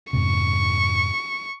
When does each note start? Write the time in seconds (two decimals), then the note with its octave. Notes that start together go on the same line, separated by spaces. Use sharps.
0.13 F2 G#2 C3 C#6